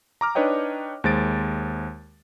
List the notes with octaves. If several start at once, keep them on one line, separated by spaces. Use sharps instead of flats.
A#5 D6 F6
D4 D#4 B4 C#5 D#5 G5
D#2 G#3 C5 A6 D7